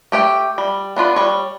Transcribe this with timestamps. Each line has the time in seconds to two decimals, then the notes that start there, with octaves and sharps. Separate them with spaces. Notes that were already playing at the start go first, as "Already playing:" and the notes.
0.12 A3 G4 C#5 G5
0.58 G3
0.96 B3 D4 F4 B4
1.16 G3 C#5